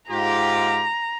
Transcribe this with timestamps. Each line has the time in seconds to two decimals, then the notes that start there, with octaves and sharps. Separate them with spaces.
0.10 G#2 F4 G4 A#5